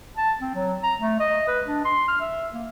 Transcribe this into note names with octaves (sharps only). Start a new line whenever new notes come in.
A5
C4
F#3
A#5
A3
D#5
B4
D4
C6
F6
E5
A#3